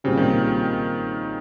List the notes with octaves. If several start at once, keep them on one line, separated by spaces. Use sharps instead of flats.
A#2 C#3 G3 C4 G4
D#3
C#3